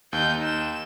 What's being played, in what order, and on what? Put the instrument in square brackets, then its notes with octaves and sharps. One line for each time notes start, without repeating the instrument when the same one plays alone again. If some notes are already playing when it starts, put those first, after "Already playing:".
[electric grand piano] D#2 [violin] D#4 G6
[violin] E7